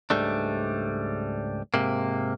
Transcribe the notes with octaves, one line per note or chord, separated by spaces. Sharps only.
C#2 G#2 G3 A3 D4
G#2 C3 A#3